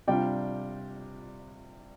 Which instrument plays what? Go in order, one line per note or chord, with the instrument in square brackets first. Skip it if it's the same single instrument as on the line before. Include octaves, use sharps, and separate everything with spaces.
[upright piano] C3 G3 D4 F4 D5 G5